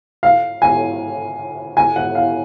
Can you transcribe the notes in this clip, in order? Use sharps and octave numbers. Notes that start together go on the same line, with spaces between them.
F5
G#5
G#5
F#5
F5